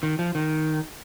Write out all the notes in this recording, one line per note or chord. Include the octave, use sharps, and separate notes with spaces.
D#3
F3
D#3